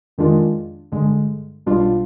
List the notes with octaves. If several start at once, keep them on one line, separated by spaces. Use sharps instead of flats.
F2 D#3 G#3 D4 F4
G1 G2 D3 G#3
B1 B2 G3 D4 F4